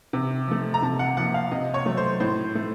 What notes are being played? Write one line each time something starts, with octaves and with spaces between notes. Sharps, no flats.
C3
F3 A3
A#5
C3 A5
F#5
F3 A#3 F#5
F5
C3 D#5
C#5
F#3 A3
C5
A2 C5
A3